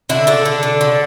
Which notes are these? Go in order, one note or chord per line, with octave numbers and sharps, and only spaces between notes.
D3 E4
D3 D4
D3
D3
D3